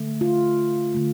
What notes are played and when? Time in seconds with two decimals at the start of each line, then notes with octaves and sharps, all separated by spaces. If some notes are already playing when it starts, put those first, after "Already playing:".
Already playing: D3 A3
0.21 F4
0.94 D3 A3